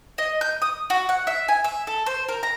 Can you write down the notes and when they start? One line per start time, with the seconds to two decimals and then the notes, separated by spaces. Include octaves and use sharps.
0.18 D#5
0.41 G6
0.62 D#6
0.90 F#4
1.09 F#5
1.27 E5
1.48 G#5
1.64 E5
1.87 A4
2.06 C5
2.29 A#4
2.43 A#5